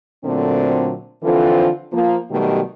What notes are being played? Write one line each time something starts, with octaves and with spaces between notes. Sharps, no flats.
A#2 D3 F#3 A3 C4
D3 E3 F3 C4 F4 A4
F3 A#3
B2 D#3 F#3 G3 A3 G4